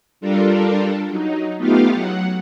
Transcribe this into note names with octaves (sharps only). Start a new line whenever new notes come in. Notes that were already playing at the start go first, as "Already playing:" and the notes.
G3 D4 F4 A4 A#4
F#3 D#4
A3 B3 D#4 F4 G4 F5
F#3 F#5